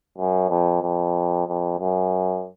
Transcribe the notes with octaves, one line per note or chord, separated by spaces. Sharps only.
F#2
F2
F2
F2
F#2